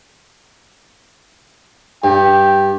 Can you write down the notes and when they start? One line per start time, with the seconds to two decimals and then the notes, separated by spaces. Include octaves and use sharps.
2.04 G2 G5